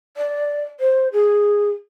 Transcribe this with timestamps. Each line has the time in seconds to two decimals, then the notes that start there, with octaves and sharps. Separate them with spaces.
0.17 D5
0.80 C5
1.13 G#4